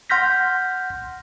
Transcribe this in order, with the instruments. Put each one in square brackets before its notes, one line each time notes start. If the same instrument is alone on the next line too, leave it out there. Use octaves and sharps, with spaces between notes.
[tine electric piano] F#5 C6 F6 G6 A#6 B6